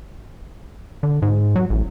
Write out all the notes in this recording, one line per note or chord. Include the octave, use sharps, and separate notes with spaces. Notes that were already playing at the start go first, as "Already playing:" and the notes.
D3
G#2
F#3
A1